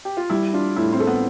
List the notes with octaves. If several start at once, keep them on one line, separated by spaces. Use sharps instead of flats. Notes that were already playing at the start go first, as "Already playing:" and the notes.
G4
F4
G3 E4
D4 F4
A2 E4
C4
A4
B3